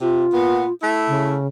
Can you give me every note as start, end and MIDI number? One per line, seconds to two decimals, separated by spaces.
0.01 0.25 48
0.01 0.73 65
0.33 0.66 46
0.33 0.66 59
0.82 1.36 57
0.82 1.36 64
1.08 1.47 49